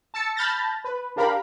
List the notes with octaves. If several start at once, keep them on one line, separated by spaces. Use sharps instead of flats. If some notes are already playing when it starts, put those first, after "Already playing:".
A5 E6 A6 C#7
A5 B5 F6 G6 A6 A#6
B4
D4 G4 A#4 F5 A#5 B5